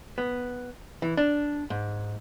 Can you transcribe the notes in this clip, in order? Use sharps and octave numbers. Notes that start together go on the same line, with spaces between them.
B3
E3
D4
G#2